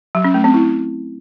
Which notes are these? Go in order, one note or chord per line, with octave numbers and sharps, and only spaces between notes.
F#3
C#4
A3
C4
E4